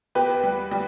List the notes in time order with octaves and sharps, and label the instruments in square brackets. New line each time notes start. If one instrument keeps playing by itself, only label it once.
[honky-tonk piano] E2 G4 B4
G3
G3